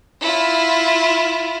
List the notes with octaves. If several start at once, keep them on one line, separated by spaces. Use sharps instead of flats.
E4 F4